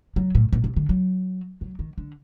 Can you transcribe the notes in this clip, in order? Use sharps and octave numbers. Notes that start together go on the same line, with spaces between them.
F#3
A2
A#2
C3
D3
F#3
F#3
D#3
D3